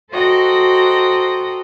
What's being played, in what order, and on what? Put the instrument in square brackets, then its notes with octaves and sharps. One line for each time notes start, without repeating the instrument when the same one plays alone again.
[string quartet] F#4 A4 C5 D#5 G5 A#5